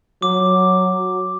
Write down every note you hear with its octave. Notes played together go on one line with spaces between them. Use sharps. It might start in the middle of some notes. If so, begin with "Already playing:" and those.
F#3 D6